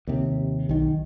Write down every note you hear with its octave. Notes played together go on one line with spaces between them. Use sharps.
D#2 C3
B1 D#3